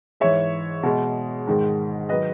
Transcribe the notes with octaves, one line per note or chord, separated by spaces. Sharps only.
G#2 E3 G#3 C#5 E5
B2 G#3
G#2 D#3 G#3
D#3 F#3 B4 D#5